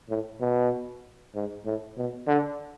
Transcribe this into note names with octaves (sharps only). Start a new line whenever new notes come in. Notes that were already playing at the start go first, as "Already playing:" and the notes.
A2
B2
G#2
A2
B2
D3